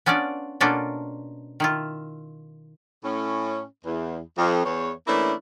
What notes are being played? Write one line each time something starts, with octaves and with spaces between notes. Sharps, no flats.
B3 C#4 D4 F4 D5
B2 A#3 C#4 D4 F4 A4
D#3 E4 F4
A2 C#4
E2
F2
E2 C#5
E3 A3 A#3 C#4 D4 E4